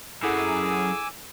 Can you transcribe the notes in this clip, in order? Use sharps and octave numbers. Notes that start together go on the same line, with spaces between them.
F#2 E4 G#4 A4 F#5 G#5 D6 E6